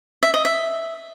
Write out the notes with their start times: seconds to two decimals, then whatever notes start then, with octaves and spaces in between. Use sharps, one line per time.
0.23 E5
0.34 D#5
0.45 E5